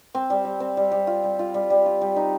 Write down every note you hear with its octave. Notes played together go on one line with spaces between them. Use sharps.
C4
G3
G3
C4
G3
G3
F4
G3
F4
G3
G3
F4
G3
D#4